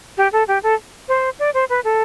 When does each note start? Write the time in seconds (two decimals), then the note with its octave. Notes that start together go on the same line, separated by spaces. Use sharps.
0.17 G4
0.33 A4
0.48 G4
0.63 A4
1.08 C5
1.39 D5
1.54 C5
1.70 B4
1.84 A4